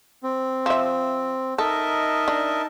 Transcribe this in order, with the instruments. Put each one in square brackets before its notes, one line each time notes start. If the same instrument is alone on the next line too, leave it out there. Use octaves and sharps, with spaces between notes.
[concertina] C4
[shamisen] F3 E5
[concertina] D#4 A5 [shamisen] A4 [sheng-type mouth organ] A#4 D#5 E5
[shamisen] D4